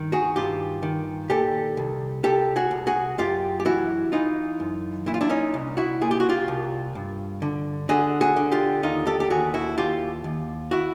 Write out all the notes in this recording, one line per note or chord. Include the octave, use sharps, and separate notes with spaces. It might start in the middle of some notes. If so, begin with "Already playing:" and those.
Already playing: G2 D#3
F#4 G#4
G2 F4 G4
D#3
A#2 G4 A4
C2
C2 G4 A4
F#4 G#4
C2
F#4 G#4
F#2 F4 G4
G4
E3 E4 F#4
E3 D#4 F4
F#2
A#2 E4
F4
D4 E4
C#4 D#4
C2
E4 F#4
A#2 G#4
G4
F#4
F4 G4
C2
G2
D3
D3 F#4 G#4
F#4 G#4
D3
F4 G4
D#2 D#4 F4
G4 A4
G4
D#2 F#4 G#4
E4 F#4
D#2 F4 G4
D#2
E4 F#4